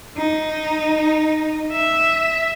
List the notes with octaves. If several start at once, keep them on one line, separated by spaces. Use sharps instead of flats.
D#4
E5